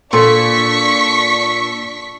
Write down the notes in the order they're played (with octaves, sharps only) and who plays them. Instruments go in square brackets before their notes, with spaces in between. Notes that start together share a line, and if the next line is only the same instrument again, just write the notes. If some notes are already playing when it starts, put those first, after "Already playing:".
[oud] A#2 [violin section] D4 C#6 B6 [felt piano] A4 C6